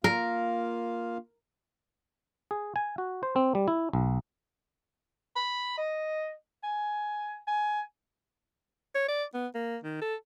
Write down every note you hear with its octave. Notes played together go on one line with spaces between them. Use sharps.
A#3 F4 A#4 F5
G#4
G#5
F#4
C5
C4
G3
E4
B1
B5
D#5
G#5
G#5
C#5
D5
B3
A#3
D#3
A4